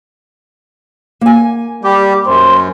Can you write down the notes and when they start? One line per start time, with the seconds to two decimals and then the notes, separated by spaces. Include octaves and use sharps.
1.21 A#3 G#5
1.84 G3 G4
2.27 F#2 C5